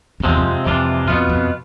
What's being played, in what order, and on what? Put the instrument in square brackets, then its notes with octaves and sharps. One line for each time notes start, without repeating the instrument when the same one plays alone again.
[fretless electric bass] F2
[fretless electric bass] E2 [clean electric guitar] C3 F3 G#3 C4
[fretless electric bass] F2
[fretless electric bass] F2 [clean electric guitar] C3 E3 G#3 D4 F4
[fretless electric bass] F2 [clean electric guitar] B2 B3 F4
[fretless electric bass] F2